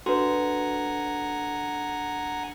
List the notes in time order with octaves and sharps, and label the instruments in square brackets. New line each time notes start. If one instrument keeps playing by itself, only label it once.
[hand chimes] D4 A4 [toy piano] F#4 B4 [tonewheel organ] F#5 G#5 A#5